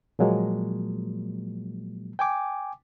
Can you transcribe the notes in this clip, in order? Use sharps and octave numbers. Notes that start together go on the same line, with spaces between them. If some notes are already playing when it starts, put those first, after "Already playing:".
A#2 F3 F#3 G#3 A#3
G5 G#5 D6